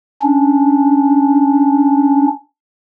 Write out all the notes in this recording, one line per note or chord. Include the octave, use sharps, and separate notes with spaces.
C#4 D4